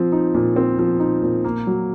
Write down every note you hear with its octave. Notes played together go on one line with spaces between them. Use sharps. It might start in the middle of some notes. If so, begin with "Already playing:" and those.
Already playing: F3 C4
D#4
A#2
C4
F3
D#4
A#2
A#3
F#3